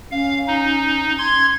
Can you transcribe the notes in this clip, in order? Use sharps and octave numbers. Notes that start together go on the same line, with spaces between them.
C#4 F5
D#4
C6 G#6